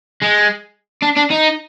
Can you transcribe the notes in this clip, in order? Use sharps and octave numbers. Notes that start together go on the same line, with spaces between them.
G#3
D4
D4
D#4